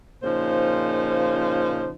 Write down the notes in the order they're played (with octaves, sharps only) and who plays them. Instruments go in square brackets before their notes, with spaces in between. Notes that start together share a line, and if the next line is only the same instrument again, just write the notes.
[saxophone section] A#2 C#3 F3 D#4 C5